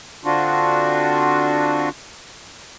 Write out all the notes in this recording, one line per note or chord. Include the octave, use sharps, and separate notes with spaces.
D3 C4 D4 F4 F#4